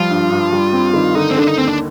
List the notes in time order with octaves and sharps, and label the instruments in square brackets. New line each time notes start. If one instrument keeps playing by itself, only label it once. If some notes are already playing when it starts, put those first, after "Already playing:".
Already playing: [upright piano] F3 G3 [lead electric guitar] F4
[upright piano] G2
G2
G3
C4
D#3
[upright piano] D3 [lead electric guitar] D#4
[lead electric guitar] C4
[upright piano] D3 [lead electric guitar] D4
[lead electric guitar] D#4
[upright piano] D#2 [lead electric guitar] C4
[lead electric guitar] D4